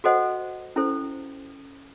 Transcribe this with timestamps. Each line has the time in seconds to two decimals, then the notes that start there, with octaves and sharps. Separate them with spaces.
0.04 F#4 A4 C5 D#5 F#5
0.76 C#4 E4 A4 C5